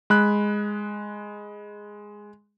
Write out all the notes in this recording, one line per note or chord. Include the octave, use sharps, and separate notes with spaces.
G#3 B5 F#6